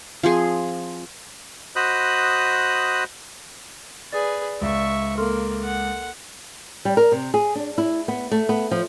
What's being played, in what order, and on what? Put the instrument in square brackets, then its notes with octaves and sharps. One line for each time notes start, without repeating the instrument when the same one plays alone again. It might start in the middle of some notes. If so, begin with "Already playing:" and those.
[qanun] F3 C4 G#4 G#5
[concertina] F#4 C5 D#5 B5 D#6 F#6
[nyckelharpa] G#4 B4 [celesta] D5 A6
[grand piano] C#2 [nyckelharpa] E5 C#6
[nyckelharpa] A#3 [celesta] A4 C6 F6
[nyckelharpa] F#5
[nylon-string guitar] G3
A#4
C3
G#4
D4
E4
B3
A3
B3
F3